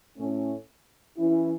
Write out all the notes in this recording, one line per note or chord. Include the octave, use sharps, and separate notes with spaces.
A2 A3 C#4
E3 C#4 E4